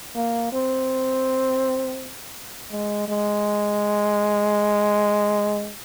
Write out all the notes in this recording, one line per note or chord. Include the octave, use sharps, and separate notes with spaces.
A#3
C4
G#3
G#3